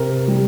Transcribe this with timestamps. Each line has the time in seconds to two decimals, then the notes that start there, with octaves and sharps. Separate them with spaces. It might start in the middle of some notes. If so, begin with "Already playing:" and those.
Already playing: C3 A#4
0.28 G3